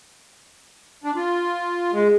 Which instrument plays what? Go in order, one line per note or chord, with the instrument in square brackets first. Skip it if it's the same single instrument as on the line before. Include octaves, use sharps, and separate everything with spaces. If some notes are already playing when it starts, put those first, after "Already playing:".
[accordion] D4
F4
[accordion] G#3 [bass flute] G#4